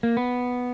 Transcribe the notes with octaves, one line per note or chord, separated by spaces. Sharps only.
A#3
B3